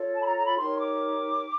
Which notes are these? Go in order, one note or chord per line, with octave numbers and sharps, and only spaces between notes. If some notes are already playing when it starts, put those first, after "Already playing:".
Already playing: F4 A4 C#5
A5
B5
A#5
A#5
B5
D#4 G4 A#4 C#5 C6
D6